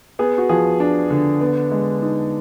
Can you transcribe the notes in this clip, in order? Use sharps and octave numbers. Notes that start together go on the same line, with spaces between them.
B3 G#4
F#4
F3 G#4
D4
D3
B3
G#3
D#4